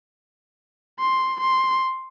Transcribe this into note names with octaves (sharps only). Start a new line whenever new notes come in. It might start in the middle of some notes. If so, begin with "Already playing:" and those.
C6
C6